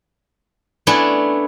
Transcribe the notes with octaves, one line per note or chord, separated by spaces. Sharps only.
A3 B3 C#4 D4 E4